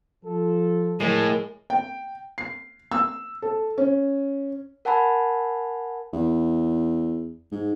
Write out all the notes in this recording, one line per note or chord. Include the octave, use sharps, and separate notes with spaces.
F3 A4
A2 G#3 A#4
G5
C7
E6
A4
C#4
A#4 F#5 G#5 A5 B5
E2
G#2